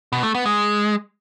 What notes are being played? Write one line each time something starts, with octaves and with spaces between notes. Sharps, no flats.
B2
A3
B3
G#3